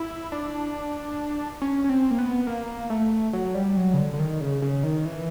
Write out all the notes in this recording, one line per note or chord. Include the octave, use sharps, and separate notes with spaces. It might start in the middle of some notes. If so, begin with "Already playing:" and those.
Already playing: E4
D4
C#4
C#4
C4
A#3
B3
A#3
A3
F#3
G3
F#3
C#3
D3
D3
D#3
C#3
C#3
D#3
E3